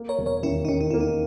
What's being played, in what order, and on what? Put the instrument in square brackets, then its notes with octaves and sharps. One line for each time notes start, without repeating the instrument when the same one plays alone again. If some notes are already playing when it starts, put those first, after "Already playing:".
Already playing: [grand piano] A#3
[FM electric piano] A#4 C#5
[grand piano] E1
[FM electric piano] A#4 C#5
[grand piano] D#2 [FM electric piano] C#4 E4
[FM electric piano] D#4
[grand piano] D#3 [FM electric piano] C#4
[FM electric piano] D#4
[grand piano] A#3 [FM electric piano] E4
[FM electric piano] D#4